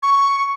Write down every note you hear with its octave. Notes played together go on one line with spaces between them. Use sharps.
C#6